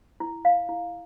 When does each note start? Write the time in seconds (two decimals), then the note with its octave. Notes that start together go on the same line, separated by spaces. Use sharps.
0.20 E4
0.45 F5
0.69 E4